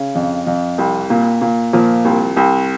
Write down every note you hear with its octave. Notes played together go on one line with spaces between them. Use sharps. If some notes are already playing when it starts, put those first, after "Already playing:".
Already playing: C#3
F2
F2
C2
A#2
A#2
A#2 F3
C2
C2